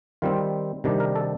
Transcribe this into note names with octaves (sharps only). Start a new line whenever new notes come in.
D#3 G3 C4 F4
C3 D#3 G3 D4
A#4
A4